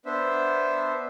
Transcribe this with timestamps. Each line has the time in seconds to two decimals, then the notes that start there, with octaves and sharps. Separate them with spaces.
0.05 B3 D4 C5 E5